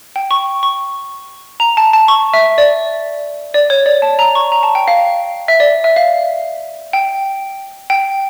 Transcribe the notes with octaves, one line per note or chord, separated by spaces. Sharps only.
G5
C#6
C#6
A#5
A5
A5
C#6
E5
D5
D5
C#5
D5
A5
A#5
C#6
A#5
A5
G5
F5
E5
D5
E5
F5
G5
G5